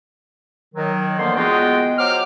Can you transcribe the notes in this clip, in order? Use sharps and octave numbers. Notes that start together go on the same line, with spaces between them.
D#3 F#3
D3 E3 F3 A#3 B3 C6
G#3 B3 F4 F#4 D#5 G5
F#3 C5 D6 F6